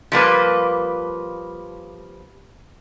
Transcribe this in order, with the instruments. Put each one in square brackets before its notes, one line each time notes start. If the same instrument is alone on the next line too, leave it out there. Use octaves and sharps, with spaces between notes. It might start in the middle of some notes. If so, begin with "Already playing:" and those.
[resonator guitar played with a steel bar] F3 G3 A#3 B4